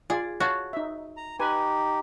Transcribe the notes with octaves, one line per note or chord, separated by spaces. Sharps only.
F4 G#4 D5
F#4 C#5 F5 A5
D#4 E5
A#5
D#4 G4 B4 G#5